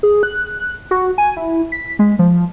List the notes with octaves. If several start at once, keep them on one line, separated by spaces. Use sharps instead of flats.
G#4
F#6
F#4
G#5
E4
B6
G#3
F3